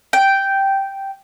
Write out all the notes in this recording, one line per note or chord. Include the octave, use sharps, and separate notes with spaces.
G5